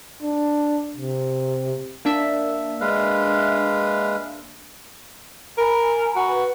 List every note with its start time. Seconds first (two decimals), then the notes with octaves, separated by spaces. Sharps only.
0.23 D4
0.97 C3
2.05 A#3 D4 E5
2.81 G#3 B4 F5
5.58 A#4 G#5 A#5 B5
6.16 F#4
6.28 B4